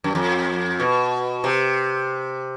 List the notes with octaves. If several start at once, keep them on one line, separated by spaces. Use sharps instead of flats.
F#2
F2
B2
C3